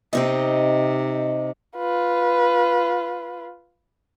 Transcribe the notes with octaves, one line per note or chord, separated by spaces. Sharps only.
C3 C4 D#4 D#5
F4 B4